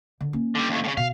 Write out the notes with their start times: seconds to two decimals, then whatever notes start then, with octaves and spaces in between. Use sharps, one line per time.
0.21 D3
0.33 A#3 C#4
0.55 D3 G3
0.69 D#2 A2
0.84 A2 C#3
0.97 B2 F5